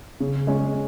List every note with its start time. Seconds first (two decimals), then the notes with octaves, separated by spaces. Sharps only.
0.20 C#3
0.47 G#3 C#4